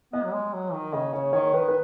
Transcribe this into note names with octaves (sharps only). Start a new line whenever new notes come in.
B3 D#5
F#3
G#3
F#3
D#3
C#3 D#5
C#3 C#5
D#3 C#5
D#3 B4
B4